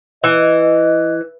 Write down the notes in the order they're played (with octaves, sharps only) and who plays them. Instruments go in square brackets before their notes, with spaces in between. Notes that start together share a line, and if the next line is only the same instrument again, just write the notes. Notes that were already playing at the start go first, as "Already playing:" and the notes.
[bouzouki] E3 [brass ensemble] D#5